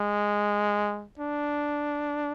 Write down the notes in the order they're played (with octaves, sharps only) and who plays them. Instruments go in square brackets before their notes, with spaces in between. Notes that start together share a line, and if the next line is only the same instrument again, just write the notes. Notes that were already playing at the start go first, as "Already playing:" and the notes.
Already playing: [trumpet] G#3
D4